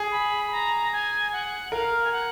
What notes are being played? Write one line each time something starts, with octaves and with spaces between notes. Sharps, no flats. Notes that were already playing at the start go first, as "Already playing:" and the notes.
Already playing: G#4
B5
A#5
G#5
F#5
A#4 F5
G#5
F#5